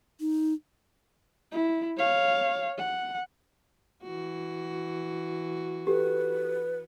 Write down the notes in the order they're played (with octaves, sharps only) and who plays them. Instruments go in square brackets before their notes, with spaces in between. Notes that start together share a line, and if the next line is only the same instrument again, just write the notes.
[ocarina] D#4
[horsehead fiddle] E4
C#5 F5
F#5
[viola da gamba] E3 F#4
[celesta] G4 A4 [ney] B4